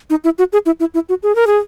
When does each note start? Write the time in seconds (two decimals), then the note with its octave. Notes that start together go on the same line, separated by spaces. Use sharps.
0.10 D#4
0.24 E4
0.38 F#4
0.53 G#4
0.66 E4
0.80 E4
0.94 E4
1.09 F#4
1.23 G#4
1.36 A#4
1.47 G#4